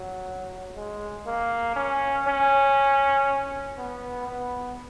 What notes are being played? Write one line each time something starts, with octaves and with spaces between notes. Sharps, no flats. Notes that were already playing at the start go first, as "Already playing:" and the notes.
Already playing: F#3
G#3
A#3
C#4
C#4
B3
B3